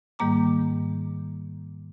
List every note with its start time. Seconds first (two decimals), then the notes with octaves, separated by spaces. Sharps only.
0.19 G#2 D#3 G3 A#3 A#5 D6